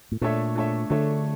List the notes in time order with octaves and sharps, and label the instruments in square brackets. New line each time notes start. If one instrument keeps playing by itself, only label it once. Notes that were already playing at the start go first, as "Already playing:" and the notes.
[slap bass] A2
[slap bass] A#2 [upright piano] A3 D4 A4 C#5 E5
[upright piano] A3 D4 A4 C#5 E5
[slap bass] D3 [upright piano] A3 D4 A4 C#5 E5